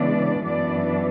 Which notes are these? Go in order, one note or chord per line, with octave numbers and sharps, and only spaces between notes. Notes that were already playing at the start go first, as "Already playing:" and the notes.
Already playing: C#3 E3 G#3 B3 D4 D5
F#2 E3 B3 D4 D5